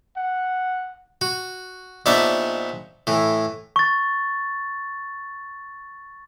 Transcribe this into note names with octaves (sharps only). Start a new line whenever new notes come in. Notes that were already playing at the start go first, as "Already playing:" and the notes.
F#5
F#4
A#1 B3 D4 D#4 D5 E5
A2 E3
C#6 A6